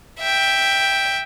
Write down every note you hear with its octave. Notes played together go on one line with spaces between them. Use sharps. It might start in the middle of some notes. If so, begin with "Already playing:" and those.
E5 G5